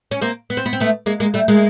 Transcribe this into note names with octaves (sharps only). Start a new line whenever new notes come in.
C#4
A#3 C4
B3
C4
B3
C4
A3 B3
G#3 A#3
G#3 A#3
G3 A3
G#3 A#3